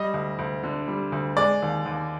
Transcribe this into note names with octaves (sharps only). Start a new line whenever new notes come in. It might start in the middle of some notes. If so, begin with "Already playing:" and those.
Already playing: G3 D#5
D2
D2
D3
G3
D2
G#3 D5
D#2
D#2